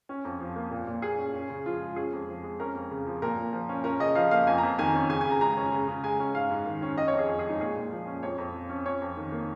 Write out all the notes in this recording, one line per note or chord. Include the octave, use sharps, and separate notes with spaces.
C#4
F2
F3
A#3
A#2
A#2
A#3 G#4
C#4
C#4
C#3
F3 F4
G#3
C#4 G#4
F2
F3
G#3
C#4 A#4
F2
C#3
F3
A#2 A#4
A#2
F3
C#4
C#4 A#4
C#3 D#5
F3 F5
A#3 F5
F2 G#5
A#5
F2
D#3 G#5
C#4
C#3 G#5
G#5
C#3
A#5
G#3 A#5
C#4
C#3
C#3
G#3 G#5
C#4
G#2 F5
G#2
D#3
C#4
C#4 D#5
C#5
F2
G#4
F3 G#4
G#4
G#3 D#4
A#2 G#4
A#2
F3
C#4
F2 C#5
F2
F3
C#4
C#4 C#5
F2
D#3
A#3